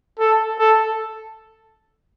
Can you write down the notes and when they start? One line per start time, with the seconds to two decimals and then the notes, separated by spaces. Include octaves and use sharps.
0.19 A4
0.59 A4